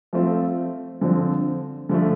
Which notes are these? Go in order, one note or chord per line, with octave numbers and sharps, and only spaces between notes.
F3 A3 C4 F4
D3 F3 C4
D3 F3 A3